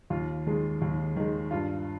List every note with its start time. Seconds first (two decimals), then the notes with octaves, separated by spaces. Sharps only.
0.10 D#2 F4
0.47 D#3 G#3
0.82 D#2
1.16 D#3 G#3
1.51 G2 F4